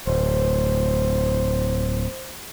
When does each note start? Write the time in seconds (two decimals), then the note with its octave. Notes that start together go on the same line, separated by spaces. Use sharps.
0.07 D1 C5